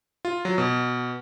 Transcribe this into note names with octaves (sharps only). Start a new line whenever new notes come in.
F4
F#3
B2